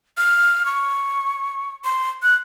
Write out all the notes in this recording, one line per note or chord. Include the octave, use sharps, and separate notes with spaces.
F6
C#6
C6
F#6